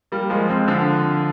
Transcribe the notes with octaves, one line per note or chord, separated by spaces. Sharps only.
G3 A#3
F3 G#3
G#3 C4
D3 F3